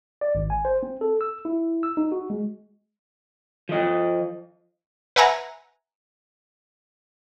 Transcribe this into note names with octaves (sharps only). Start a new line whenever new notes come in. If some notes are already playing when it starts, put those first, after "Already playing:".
D5
G#1
G#5
C5
C4
A4
E6
E4
E6
D#4
F#4
G#3
F3 D#5
B4 E5 F#5 G#5 A#5